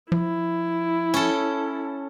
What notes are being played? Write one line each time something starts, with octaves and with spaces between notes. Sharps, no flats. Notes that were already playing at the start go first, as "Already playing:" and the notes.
F3 E4
C#4 A4